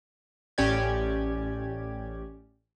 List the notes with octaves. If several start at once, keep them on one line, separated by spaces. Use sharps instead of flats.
A1 C#4 G4 D5 G#6